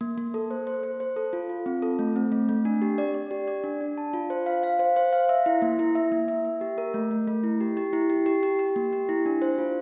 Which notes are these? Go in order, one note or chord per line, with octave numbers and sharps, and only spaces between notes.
A#3
A#3
A4
C5
C5
C5
C5
A4
F4
F4
C4
A4
A3
C4
A3
A3
D4
G4
D5
D5
G4
D5
D4
D4
A5
F4
C5
F5
F5
C5
C5
F5
E5
E4
A#3
E4
E5
A#3
E5
E5
G4
A#4
A3
A3
A3
E4
G4
G4
E4
G4
G4
G4
G4
A#3
G4
E4
D4
C5
F4